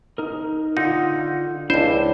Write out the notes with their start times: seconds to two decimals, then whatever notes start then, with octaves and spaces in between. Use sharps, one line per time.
0.18 D#4 A#4
0.77 D3 D#4 F4 F#5
1.70 C#2 D4 E4 C5